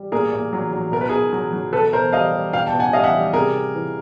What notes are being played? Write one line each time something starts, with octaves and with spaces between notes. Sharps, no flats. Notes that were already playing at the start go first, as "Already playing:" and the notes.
Already playing: G3
A#2 G#4 A#4
A#2
F#3
F#3
B2 A#4
B4
B2 G#4 A#4
F#3
F#3
B2 A4 B4
B2 A#4 C5
G3 D#5 F5
G3
B2 F5 G5
G5 A5
B2
F#5 G#5
G3 D#5 F5
E5 F#5
G3
C3 G#4 A#4
G3
E3